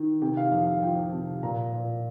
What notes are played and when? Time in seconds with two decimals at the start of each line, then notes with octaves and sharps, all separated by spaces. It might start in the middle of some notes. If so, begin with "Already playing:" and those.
Already playing: D#3
0.22 C3 G5
0.37 F5
0.51 F2 F5
0.67 F5
0.82 F3 G5
1.12 C3
1.43 A#2 A#5
1.73 A#2